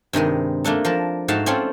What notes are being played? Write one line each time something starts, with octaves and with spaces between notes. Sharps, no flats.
G2 C3 D#3 G#3
A3 A#3 D4 A4
F3 A#4 A5
G#2 A3 F#4 F5 G5 A5
C4 C#4 F4 A4 C#5 D5